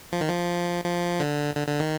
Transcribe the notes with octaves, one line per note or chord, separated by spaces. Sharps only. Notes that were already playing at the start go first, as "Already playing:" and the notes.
F3
D#3
F3
F3
D3
D3
D3
D#3